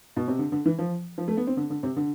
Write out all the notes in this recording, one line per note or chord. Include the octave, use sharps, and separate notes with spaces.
B2
C3
D3
D3
E3
F3
F3
A3
B3
C4
D3
D3
C3
D3